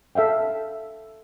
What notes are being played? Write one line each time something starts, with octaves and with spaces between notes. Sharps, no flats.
A4 E5 F5 G5